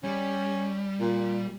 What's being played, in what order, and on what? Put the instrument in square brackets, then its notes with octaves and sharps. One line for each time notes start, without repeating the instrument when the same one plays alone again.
[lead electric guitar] G3 [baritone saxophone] C#4
[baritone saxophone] A#2